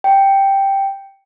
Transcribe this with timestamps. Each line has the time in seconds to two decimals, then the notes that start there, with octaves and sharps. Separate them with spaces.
0.04 G5